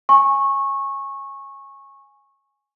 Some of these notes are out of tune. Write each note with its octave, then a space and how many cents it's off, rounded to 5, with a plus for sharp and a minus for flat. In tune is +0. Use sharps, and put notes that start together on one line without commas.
G#5 +0 C#6 -15